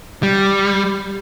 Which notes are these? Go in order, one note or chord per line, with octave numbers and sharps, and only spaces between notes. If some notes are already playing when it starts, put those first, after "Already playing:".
G3